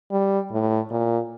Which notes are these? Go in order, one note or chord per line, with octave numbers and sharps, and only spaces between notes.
G3
A2
A#2